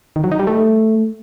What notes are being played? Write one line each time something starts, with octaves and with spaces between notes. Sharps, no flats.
D#3
F#3
D#4
G3
A3